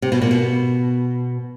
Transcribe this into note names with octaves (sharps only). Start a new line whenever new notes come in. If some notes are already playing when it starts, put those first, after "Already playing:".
C3
B2
A#2
B2